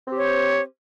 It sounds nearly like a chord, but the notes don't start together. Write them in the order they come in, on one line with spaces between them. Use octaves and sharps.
C4 G4 C#5 C5